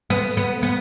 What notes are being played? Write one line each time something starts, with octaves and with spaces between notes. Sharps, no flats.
B3
B3
B3